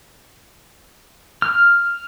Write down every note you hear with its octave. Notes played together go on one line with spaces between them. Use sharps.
F6